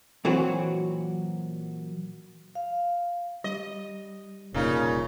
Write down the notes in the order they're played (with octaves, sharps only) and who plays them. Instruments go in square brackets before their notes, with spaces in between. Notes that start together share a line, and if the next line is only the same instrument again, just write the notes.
[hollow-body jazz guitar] A#2 E3 F#3 C4 F#4
[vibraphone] F5
[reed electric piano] G3 [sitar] D#5
[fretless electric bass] F1 [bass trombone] A#2 [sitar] C#3 D#4